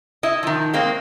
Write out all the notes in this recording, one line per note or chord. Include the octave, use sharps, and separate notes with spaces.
E4 D#5
D#3 F3
G#3 A#3 C4